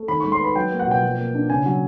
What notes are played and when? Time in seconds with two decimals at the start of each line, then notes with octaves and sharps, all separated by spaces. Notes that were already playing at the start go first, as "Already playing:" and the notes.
Already playing: A3
0.08 D#3 B5
0.20 G#3 C#6
0.32 C6
0.39 B3
0.44 B5
0.55 F#3 G5
0.71 A#3
0.79 F#5
0.87 B2 G5
1.03 F3
1.18 A#3
1.34 D4
1.50 C#3 G#5
1.66 F#3